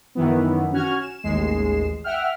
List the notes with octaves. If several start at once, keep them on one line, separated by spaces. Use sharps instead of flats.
F#2 D#3 E3 B3
C#4 F#4 F6 G#6
E7
A1 D#2 G#3 C7 E7
E5 F#5 G5 F6